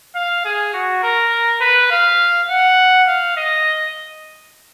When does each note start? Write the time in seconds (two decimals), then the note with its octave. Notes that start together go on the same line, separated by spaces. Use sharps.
0.15 F5
0.45 G#4
0.74 F#4
1.03 A#4
1.61 B4
1.91 F5
2.50 F#5
3.08 F5
3.37 D#5